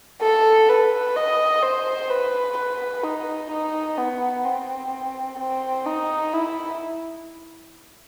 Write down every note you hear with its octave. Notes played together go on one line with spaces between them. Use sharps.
A4
B4
D#5
C5
B4
B4
D#4
D#4
B3
C4
C4
D#4
E4